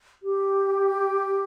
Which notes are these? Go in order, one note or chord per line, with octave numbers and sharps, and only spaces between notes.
G4